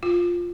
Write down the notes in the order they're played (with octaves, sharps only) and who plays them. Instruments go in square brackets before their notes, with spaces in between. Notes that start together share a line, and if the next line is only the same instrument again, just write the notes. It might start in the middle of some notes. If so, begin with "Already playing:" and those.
[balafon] F4